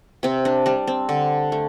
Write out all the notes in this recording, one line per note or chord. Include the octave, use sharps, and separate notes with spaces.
C3 C4
D4
G3 D4
C4
D3
A3